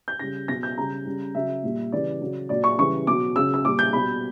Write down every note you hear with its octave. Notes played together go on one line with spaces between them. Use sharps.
G6
C#3 G3 A#6
B2 F#3 A#6
G6
C#3 G3 A#5
C#3 G3
C#3 F#3 E5
A#2 G3
C#3 E3 G3 D5
C#3 F#3
A#2 F#3 D5
C#6
C#3 E3 G3 C#6
B2 F#3 D6
C#3 F#3 E6
E6
A#2 G3 D6
G6
B2 G3 B5